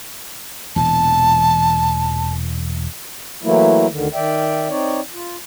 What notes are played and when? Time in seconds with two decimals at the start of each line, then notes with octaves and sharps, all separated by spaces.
0.76 E1 A#2 E3 A5
3.43 E3 F#3 A3 A#3 E4
3.91 D2 D3 D#3
4.14 D#3 D5 E5 G5
4.69 C4 D#4 C#5 D5
5.13 F4